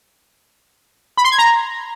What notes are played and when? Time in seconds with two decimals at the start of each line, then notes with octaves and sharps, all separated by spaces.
1.17 B5
1.24 C6
1.31 G#6
1.38 A#5